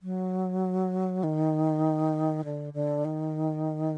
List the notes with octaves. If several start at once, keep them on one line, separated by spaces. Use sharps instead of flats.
F#3
D#3
D3
D3
D#3